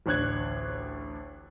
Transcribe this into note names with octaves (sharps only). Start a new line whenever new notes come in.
A1 D2 D4 C#5 F#6 G#6